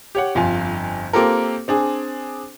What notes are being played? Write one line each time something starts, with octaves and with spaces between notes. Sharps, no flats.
G4 C#5 F#5
G1 F2 F4 G#5
A#3 C4 F4 G4 A4 A#4
C4 D4 G#4